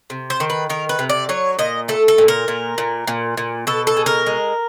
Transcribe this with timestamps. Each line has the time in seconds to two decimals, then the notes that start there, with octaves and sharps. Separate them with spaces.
0.10 C3
0.30 C5
0.40 D#3
0.50 B4
0.70 D#3 A#4
0.89 B4
0.99 C3
1.10 D5
1.29 F#3 C#5
1.59 A#2 D#5
1.88 A3 A4
2.08 A4
2.18 A#2
2.28 A#4
2.48 A#2
2.78 A#2
3.07 A#2
3.37 A#2
3.67 B2 A4
3.87 A4
3.97 G#3
4.06 A#4
4.26 G#3